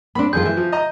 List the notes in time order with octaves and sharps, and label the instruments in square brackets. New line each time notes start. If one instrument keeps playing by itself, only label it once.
[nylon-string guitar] B3 C4 D4 [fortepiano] B5
[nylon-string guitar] F2 D#3 F4 [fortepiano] G#4 [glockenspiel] G6
[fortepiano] E3 [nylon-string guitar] E5
[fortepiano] F3
D#5 A#5